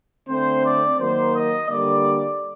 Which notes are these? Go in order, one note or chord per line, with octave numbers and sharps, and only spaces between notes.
D3 A3 C4 C5
D5
D#3 F#3 A#3 C5
D#5
D3 G3 A#3 D5